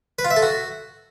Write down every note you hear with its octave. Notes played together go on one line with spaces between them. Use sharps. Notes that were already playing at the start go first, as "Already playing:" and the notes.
B4
F4
E5
A4
F#4